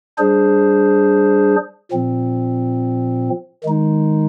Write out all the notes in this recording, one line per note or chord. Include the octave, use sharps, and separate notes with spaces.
G3 D4 G#4 C5
A#2 F3 C4
D#3 G#3 D#4